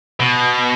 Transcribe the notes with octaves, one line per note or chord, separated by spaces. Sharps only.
B2